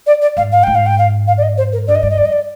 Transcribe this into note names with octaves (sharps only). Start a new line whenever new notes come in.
D5
D5
G#2 F5
F5
G#2 G5
F5
G5
F5
F5
D5
D#5
C5
A#4
G2 D5
D#5
G2 D5
D#5
F2 D5
D#5
D5